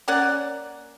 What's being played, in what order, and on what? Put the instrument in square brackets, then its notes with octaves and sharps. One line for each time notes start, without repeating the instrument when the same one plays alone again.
[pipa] A#3 C#4 D5 F#5